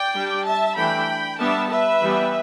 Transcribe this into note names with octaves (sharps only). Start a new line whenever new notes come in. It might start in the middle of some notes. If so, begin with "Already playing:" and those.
Already playing: D5 G5
G3 D4
E5 A5
E3 A3 D4 G5 B5
G3 B3 D4 E5 A5
B4 E5
E3 G3 B3